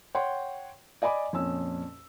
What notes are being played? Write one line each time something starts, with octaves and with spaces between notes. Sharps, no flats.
C#5 F#5 G5 C6
D5 D#5 G#5 B5 D6
F2 A#2 C#4 E6